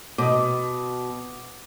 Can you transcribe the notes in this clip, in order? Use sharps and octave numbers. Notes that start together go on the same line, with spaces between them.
B2 D6 D#6